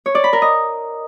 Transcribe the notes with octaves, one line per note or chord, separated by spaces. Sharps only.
C#5
D5
B5
A#4
D#5